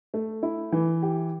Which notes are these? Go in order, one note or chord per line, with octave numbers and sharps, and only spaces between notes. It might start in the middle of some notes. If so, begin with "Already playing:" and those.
A3
E4
E3
G4